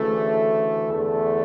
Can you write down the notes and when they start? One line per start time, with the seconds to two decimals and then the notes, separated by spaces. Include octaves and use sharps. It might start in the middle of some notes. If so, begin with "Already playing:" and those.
Already playing: D2 C#3 E3 A3
0.88 E2 D3 A3